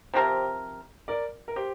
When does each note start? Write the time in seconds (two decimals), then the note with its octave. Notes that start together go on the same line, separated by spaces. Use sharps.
0.14 C3 F3 C4 G4 A#4 C5
1.08 A#4 D5
1.48 A#4
1.56 G4 C5